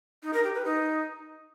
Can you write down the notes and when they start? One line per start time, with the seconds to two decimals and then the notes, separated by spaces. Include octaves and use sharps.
0.23 D#4
0.33 A#4
0.44 G4
0.54 B4
0.65 D#4